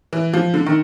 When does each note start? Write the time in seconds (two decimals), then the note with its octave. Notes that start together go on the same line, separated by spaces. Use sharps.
0.13 E3
0.34 F3
0.54 D3
0.66 D#3